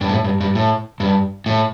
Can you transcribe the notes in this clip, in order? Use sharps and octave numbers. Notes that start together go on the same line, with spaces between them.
G2
A2
G2
G2
A2
G2
A2